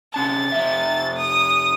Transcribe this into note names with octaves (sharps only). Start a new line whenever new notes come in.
C3 C#4 A5 A6
F2 C3 E5
D#6